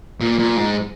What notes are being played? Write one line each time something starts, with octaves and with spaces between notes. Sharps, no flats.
A#2
A#2
G#2